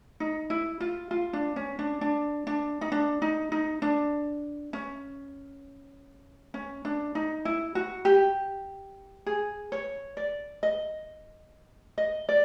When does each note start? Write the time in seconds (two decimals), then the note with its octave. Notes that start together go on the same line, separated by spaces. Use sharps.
0.20 D#4
0.50 E4
0.80 F4
1.11 F4
1.33 D4
1.56 C#4
1.79 D4
2.01 D4
2.47 D4
2.81 D#4
2.92 D4
3.22 D#4
3.52 D#4
3.82 D4
4.73 C#4
6.54 C#4
6.85 D4
7.15 D#4
7.45 E4
7.75 F#4
8.05 G4
9.26 G#4
9.72 C#5
10.17 D5
10.63 D#5
11.98 D#5
12.29 D5